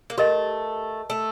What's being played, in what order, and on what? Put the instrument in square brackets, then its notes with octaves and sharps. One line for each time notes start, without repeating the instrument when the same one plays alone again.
[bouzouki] A#3
[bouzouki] A3 [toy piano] G4 A#4 D#5
[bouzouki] A3